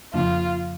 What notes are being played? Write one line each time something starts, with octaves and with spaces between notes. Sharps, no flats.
F2 C#3 F3 A#3 D4 F4